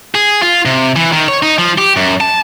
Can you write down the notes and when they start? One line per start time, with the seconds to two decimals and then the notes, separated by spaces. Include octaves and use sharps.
0.15 G#4
0.42 F4
0.65 C3
0.96 E3
1.12 D#3
1.28 C#5
1.43 D#4
1.58 F3
1.78 G4
1.96 F#2
2.21 A5